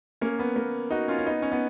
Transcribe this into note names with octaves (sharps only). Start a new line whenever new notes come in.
A#3 C#4
B3
A#3
D#4 F#4
C#4 F4
C#4
B3 D#4
C#4
B3